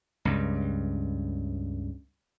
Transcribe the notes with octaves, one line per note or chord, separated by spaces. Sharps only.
C#2 G2